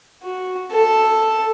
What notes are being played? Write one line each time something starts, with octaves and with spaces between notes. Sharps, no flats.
F#4
A4